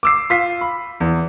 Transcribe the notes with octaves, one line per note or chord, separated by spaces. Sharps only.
D6 E6 C7
F4 B6 C7
B5
E2